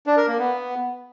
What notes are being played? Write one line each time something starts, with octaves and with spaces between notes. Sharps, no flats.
D4
A#4
A#3
B3